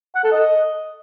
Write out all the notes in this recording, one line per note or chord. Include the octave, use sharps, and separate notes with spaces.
F#5
A4
D#5